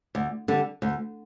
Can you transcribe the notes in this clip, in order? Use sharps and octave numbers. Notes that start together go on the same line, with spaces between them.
D2
D3 G3
D2